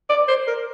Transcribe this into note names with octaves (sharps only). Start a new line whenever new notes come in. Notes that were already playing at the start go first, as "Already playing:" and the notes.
D5
C5
A#4